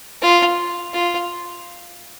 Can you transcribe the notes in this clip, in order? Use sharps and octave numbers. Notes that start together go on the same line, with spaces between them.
F4
F4